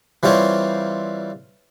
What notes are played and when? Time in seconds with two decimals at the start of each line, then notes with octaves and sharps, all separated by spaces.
0.23 E3 G3 C4 F4 G4 C#5